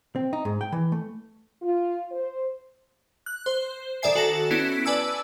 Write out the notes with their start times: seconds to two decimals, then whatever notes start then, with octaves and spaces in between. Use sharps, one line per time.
0.16 C4
0.33 D#4
0.45 G#2
0.61 G5
0.72 E3
0.92 A3
1.62 F4
2.12 C5
3.26 F#6
3.46 C5
4.02 D#3 A4 D5 E5 G#5 C7
4.15 F#4 A4 A5 A#6
4.50 B3 C#4 E4 B6 D7
4.85 B4 D5 G#5 A5 E6